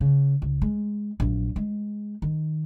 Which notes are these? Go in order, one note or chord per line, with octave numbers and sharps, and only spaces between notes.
C#3
C#2
G#3
A#1 F#3
G#3
D#3